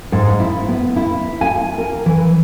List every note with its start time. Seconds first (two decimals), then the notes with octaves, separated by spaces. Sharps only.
0.12 G#2
0.40 E4
0.69 B3
0.96 E4
1.41 G#5
1.78 A#4
2.06 E3